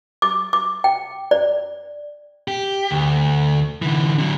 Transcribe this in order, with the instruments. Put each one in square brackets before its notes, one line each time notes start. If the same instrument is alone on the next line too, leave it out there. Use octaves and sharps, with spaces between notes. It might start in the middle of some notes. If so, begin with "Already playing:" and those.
[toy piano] D6
D6
G5
D5
[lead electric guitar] G4
D2
D3 E3
D3 F#3